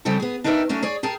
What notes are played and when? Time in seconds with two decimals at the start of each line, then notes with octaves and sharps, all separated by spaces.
0.05 C#3 F3 G3 C4 G4 A4
0.20 B3 G#4
0.44 D4 D#4 G4 A#4 B4 E5
0.69 F#3 A3 C#4 D4
0.83 G#4 C#5 D5 G#5
1.03 G4 G#4 A#4 A5